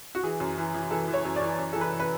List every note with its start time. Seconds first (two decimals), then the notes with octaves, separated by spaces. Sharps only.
0.15 F#4
0.23 E3 G#4
0.40 F#2
0.58 E3
0.74 E3
0.91 E3 A4
1.08 E3
1.14 C#5
1.25 F#2
1.36 D5
1.42 E3
1.58 F#2
1.73 E3 A4
1.81 B4
1.93 E3
2.00 B4